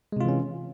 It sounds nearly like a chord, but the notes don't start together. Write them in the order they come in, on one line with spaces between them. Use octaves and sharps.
G#3 C3 F4 E3 C#4